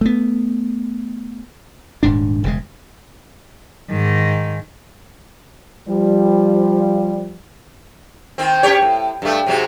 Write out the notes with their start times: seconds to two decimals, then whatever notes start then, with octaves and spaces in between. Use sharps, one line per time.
0.01 A3 B3
2.03 D#1 G#2 D4
2.44 E1 C#3 G#3
3.90 G#2 D#3
5.88 F3 G3
8.38 D#3 C4
8.63 F#2 G4 C#5
8.82 A2
9.22 G2 A3
9.46 G#2 C3 F#3